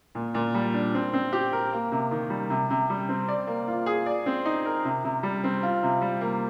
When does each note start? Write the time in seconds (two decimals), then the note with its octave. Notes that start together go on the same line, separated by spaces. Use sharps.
0.15 A#2
0.34 A#2
0.55 G3
0.74 D4
0.94 C4
1.13 C4
1.33 G4
1.52 A#4
1.72 A#3
1.92 C3
2.11 D#3
2.30 G3
2.50 C3
2.70 C3
2.90 G3
3.09 C4
3.28 D5
3.47 A#3
3.68 F4
3.86 G#4
4.06 D5
4.26 C4
4.45 D#4
4.66 A#4
4.85 C3
5.04 C3
5.23 G3
5.44 C4
5.63 F4
5.83 C3
6.02 G3
6.21 A#3